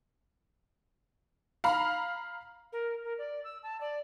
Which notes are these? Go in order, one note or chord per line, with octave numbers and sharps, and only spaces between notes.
F5 A#5 B5
A#4
A#4
D5
E6
A5
D5